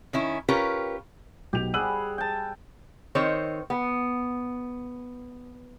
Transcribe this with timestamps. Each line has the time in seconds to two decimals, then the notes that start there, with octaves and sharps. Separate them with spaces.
0.13 D#3 C#4 E4
0.48 C#4 F4 G4 A#4 B4 C#5
1.53 B1 G4 F7
1.74 G3 G#4 F#5 E6 D#7 F#7
2.18 G5 A5
3.15 D#3 C4 C5 C#5
3.70 B3